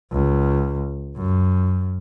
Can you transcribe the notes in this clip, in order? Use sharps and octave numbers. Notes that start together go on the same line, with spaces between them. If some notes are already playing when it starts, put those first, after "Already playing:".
C#2
F#2